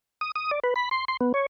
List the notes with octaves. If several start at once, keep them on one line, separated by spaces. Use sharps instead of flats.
D#6
D#6
D5
B4
B5
C6
C6
B3
C#5